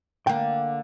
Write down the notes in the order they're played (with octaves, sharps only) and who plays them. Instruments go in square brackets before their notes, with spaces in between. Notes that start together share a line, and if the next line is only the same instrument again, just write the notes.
[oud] D3 A#3 [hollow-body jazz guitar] G5